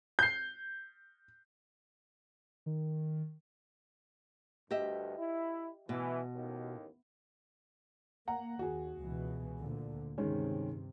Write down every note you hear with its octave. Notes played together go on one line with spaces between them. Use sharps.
G6 C7
D#3
D2 G2 G4 D#5 E5
E4
B2 E3
A1 D#2
A#3 F#5 A#5
D#2 F#4 G#4
C#2 B2 E3
D2 A#2 D3
G2 C3 D#3 G#3 C#4